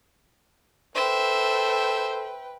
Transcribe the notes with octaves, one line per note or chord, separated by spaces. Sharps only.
A4 B4 C5 E5 G5